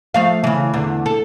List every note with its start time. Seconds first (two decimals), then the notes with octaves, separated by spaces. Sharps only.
0.14 F3 A3 F5
0.44 C#3 E3
0.73 E2 D3
1.06 A4